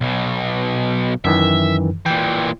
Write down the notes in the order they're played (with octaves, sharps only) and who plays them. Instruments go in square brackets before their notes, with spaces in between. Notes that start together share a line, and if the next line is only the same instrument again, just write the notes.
[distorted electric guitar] B1 B2
[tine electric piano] F#2 D#3 E3 [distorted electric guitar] E5
[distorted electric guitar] A#2 E3 [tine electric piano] G5